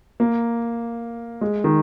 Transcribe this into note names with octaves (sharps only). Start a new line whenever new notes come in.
A#3
G#3
D#3